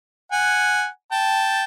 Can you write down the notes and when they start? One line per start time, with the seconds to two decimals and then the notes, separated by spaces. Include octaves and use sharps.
0.32 F#5 G#5
1.11 G5 A5